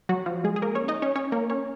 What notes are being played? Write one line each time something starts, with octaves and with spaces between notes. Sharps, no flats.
F#3 F#4
F3 F4
G#3 G#4
G#4
A#3 A#4
C#4 C#5
D#4 D#5
C#4 C#5
C#4 C#5
A#3 A#4
C#4 C#5